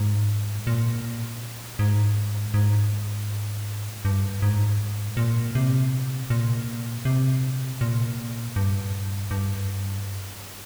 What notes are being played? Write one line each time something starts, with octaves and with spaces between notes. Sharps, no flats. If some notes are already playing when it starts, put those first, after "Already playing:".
Already playing: G#2
A#2
G#2
G#2
G2
G#2
A#2
C3
A#2
C3
A#2
G2
G2